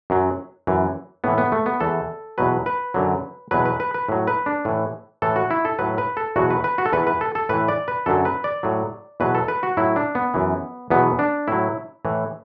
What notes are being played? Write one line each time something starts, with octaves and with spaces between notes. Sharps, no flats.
F#2 F#3
F#2 E3
A2 E3 B3
B3
A3
B3
E2 E3 A4
E2 B2 F#3 B4
B4
F#2 D3 F#3
E2 B2 F#3 B4
B4
B4
B4
A2 F#3
B4
D4
A2 E3
A2 E3 A4
F#4
E4
A4
A2 F#3 B4
B4
A4
E2 B2 F#3 F#4
B4
B4
F#4
A4
E2 E3 B4
B4
A4
A4
A2 E3 B4
D5
B4
F#2 D3 F#3 A4
B4
D5
A2 F#3
E2 B2 F#3 B4
A4
B4
F#4
A2 F#3 E4
D4
B3
F#2 E3
E2 B2 F#3 B3
D4
A2 F#3 E4
A2 E3